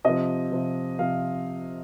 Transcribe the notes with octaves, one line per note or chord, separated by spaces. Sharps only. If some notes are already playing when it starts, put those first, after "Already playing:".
C3 F3 D#5
C3 F3
C3 F3 F5